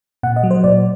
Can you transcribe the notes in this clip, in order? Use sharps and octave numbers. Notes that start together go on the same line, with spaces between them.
A#2 F#5
D#5
F#3
C5
A#2 D5